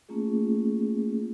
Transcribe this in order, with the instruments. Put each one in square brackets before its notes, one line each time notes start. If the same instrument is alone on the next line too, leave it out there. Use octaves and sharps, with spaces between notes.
[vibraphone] A3 A#3 C#4 F4 G#4